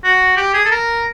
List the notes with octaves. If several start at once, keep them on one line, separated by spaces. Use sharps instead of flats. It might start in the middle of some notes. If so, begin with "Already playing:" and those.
F#4
G4
G#4
A4
A#4